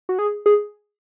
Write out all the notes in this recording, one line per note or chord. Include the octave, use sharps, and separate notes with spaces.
F#4
G#4
G#4